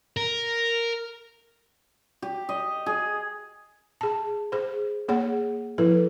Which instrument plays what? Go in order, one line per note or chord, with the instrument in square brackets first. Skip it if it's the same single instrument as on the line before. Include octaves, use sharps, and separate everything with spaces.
[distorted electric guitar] A#4
[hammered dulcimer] G4
D#5
G#4
[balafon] G#4 A5
G#4 C5
A#3 G#4 C#5 F#5
F3 E4 A4 B4